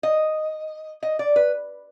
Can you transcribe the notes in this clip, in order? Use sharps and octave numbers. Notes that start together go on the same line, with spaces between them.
D#5
D#5
D5
B4